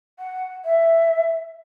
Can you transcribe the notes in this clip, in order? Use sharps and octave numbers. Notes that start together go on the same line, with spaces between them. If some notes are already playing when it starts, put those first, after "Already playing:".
F#5
E5